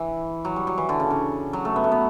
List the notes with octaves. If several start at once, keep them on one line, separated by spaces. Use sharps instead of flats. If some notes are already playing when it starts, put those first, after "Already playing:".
Already playing: E3
F#3
G3
F#3
E3
D3
C#3
C#3
F#3
A3
B3
A3
B3